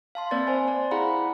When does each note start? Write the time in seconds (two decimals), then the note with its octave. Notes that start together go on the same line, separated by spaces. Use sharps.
0.15 F5 A5 C6
0.31 A#3 C4 B4 D5 A6
0.47 C5 G#5
0.67 D5 C6
0.91 E4 G#4 F5 F#5 A#5 B5